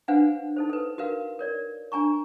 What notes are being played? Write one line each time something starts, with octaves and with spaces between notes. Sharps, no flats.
D4 B4 C5 F5 F#5 G#5
D#4 A4 C5
A4 B4
F#4 A#4 B4 F5
A#4 C#5 D5
D4 G#5 A#5 C#6